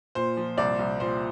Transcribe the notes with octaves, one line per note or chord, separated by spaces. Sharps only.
A#2 C5
F3
C2 D5
C2
A#2 C5